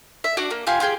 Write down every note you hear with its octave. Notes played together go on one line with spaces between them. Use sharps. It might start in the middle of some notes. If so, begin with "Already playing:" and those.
E5
D4 F#4 D5 F#5
A#3
F4 G4 F5 G#5
F4 G4 G#4 G5